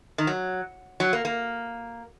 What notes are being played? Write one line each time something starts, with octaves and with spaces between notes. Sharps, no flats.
D#3
F#3
F#3
A#3
A#3